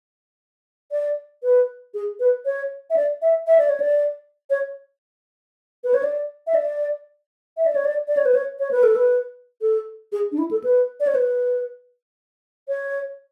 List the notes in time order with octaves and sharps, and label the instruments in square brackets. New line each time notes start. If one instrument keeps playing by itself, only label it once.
[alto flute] D5
B4
G#4
B4
C#5
E5
D5
E5
E5
D5
C#5
D5
C#5
B4
C#5
D5
E5
D5
E5
D5
C#5
D5
D5
C#5
B4
C#5
C#5
B4
A4
B4
A4
G#4
D4
E4
A4
B4
D5
C#5
B4
C#5